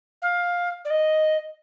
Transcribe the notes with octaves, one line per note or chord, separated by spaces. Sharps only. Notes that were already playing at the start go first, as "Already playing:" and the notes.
F5
D5
D#5